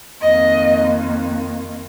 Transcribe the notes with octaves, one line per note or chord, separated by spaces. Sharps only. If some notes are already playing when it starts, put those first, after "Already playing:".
F2 D#3 A#3 D#5